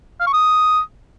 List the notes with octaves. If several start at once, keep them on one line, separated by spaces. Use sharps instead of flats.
F5
C#6
D#6